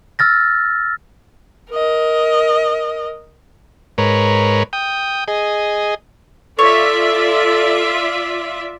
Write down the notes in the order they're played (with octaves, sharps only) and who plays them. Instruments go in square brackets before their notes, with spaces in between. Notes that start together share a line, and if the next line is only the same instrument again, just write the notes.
[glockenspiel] E6 F6 A6 A#6
[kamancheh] A#4 D#5
[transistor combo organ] G#2 A#4 B4 C#5
G5 D#6
G#4 D#5
[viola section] F4 D5 E5 [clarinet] A4 [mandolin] C#5